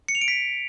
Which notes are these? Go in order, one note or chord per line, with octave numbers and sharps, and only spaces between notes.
C#7
F7
D7
B6